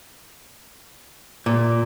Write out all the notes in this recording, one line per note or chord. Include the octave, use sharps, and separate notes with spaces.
A#2